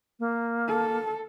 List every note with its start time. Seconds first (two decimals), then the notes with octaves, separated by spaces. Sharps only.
0.20 A#3
0.68 A4